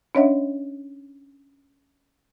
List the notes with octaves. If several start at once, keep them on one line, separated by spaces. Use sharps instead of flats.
C#4 D4 C#5 D#5 E5 F#5